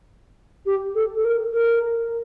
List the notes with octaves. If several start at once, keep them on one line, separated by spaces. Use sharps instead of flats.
G4
A4
A4
A#4
A#4